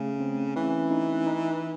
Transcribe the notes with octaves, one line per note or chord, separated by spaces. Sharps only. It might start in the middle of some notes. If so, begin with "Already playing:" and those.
Already playing: C#3 A3
C4
E3 C#4
D#4
D#4